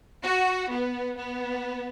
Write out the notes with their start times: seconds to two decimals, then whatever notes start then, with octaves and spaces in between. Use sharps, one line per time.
0.24 F#4
0.71 B3
1.17 B3